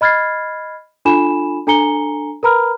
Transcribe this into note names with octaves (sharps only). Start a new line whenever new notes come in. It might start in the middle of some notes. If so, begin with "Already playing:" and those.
D#5 B5 F6 G#6 A6 C7
D4 F4 A4 G#5 B5 E7
D4 A4 G#5 A#5 C#7 G7
A#4 B4 A#5 B5 F6